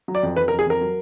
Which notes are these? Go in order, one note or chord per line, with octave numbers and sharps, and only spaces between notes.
F#3
D5
F2
F2 B4
A#4
F2
G#4
F2 A#4
F#3